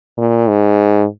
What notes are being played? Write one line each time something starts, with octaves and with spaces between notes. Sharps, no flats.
A#2
G#2